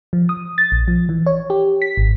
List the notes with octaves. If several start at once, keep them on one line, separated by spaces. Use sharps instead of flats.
F3
D#6
A6
A#1
F3
E3
C#5
G4
B6
G#1